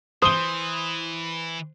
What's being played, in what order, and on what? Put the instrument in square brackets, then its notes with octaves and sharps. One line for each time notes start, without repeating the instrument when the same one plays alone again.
[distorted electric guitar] E3 [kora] C5 [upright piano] D#6 G7